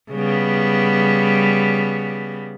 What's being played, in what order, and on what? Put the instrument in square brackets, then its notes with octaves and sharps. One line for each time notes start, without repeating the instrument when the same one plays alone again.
[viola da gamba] C#3 G3 B3